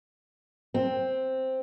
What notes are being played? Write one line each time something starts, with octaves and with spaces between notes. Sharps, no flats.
C4